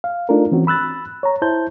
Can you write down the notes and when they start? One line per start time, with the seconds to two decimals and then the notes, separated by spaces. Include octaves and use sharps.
0.04 F5
0.29 A3 D4 D#4 F4 A4 A#4
0.52 E3 C4 C#4 F#4
0.67 B5 E6 F#6 A6
1.23 C#5 A#5
1.42 E4 C5 A5 G6